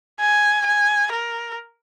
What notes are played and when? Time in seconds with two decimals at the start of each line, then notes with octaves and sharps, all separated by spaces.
0.20 G#5
0.66 G#5
1.12 A#4